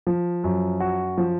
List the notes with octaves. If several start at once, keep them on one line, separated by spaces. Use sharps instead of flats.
F3
F#2
F#4
F3